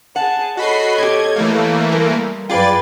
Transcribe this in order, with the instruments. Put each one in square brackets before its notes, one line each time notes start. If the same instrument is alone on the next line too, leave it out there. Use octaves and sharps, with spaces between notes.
[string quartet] G#4 A5 [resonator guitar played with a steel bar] F#5
[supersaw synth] F#4 B5 C7 [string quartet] A4 C#5 D#5
[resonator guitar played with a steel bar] B2 G4 [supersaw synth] G#6
[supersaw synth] E3 A3 A#3
[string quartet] G3 [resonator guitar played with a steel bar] G#3 A#4
[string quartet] F#2 B4 G5 [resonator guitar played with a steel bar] F4 G#4 [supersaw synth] D5 A6